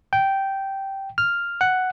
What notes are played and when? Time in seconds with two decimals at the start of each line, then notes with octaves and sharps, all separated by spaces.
0.13 G5
1.18 F6
1.61 F#5